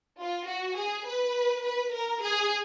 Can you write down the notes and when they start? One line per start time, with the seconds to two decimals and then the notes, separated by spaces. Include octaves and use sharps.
0.21 F4
0.48 F#4
0.77 G#4
1.06 B4
1.63 B4
1.92 A#4
2.21 G#4